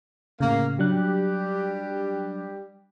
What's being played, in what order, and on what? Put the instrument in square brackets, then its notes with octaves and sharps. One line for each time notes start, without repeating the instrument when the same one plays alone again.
[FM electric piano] A2 C#3 [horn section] A#3 F5
[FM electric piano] F#3 D4 F#6 [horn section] G3 G4